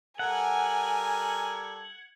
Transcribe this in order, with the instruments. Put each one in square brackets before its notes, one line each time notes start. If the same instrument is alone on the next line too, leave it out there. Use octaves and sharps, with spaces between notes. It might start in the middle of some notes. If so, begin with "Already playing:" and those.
[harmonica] G3 A4 A#4 [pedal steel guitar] F#5 [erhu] G#5 [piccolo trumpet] G#6